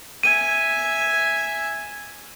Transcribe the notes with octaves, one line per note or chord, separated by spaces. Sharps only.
E5 G#5 D#7